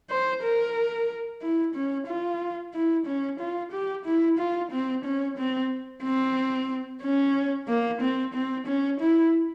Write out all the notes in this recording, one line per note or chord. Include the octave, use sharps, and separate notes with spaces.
C5
A#4
E4
C#4
F4
E4
C#4
F4
G4
E4
F4
C4
C#4
C4
C4
C#4
A#3
C4
C4
C#4
E4